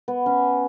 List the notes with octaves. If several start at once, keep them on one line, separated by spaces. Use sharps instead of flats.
B3
C#4